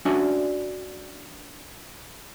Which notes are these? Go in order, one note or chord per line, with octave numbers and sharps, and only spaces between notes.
C#4 D4 F#4 D5 E5 G#5